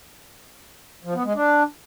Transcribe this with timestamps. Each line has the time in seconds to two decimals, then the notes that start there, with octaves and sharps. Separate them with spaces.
1.04 F3
1.14 B3
1.24 G#3
1.35 D4